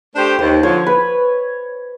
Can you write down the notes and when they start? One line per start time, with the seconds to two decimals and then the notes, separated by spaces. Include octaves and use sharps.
0.15 A3 D4 G4 C5
0.39 D#2 C5
0.63 D3 F3 C#5
0.87 B4